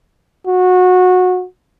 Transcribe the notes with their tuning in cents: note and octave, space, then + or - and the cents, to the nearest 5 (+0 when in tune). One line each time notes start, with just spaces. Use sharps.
F#4 -20